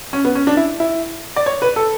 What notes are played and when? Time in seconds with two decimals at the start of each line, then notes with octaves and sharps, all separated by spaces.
0.13 C#4
0.25 B3
0.35 C#4
0.47 D4
0.57 E4
0.80 E4
1.36 D5
1.46 C#5
1.62 B4
1.76 A4